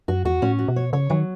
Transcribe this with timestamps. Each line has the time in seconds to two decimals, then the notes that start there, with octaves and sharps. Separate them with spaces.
0.08 F#2 F#4
0.25 E2 F#4
0.42 A2 C#4
0.59 F#4
0.68 B2
0.76 C#5
0.93 C#3 C#5
1.10 D#3 F#3